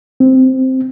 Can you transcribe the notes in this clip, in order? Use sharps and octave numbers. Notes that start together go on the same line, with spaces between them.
C4